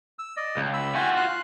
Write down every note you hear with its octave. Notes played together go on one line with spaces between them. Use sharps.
E6
D5 D#5
C#2
B5 E6
F4 F#4 E5 G5 G#5
F5 C6 F#6